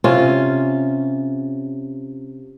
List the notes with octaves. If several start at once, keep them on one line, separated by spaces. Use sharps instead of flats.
C3 C#4 F4